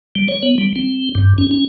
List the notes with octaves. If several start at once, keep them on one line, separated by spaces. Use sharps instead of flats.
G3
C#5
B3
G3
C4
G2
C#4
C#4